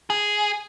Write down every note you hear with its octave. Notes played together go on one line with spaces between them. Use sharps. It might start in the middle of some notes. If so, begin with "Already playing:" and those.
G#4